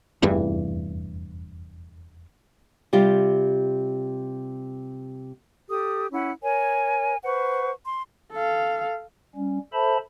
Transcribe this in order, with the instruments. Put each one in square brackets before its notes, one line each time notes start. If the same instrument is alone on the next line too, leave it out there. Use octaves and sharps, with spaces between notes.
[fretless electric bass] F1 E2 G2 E3
[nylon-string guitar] C3 G3 F4 G4
[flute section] G4 A4 D#6
C#4 E4 F#5
A#4 C#5 G#5
B4 C5 F#5 C#6
C6
[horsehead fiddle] A4 F5
[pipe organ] G3 C#4
A4 C5 E5 A5 B5